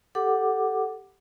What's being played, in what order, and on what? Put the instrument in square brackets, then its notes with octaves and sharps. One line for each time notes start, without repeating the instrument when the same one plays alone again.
[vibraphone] G4 A4 F#5 D6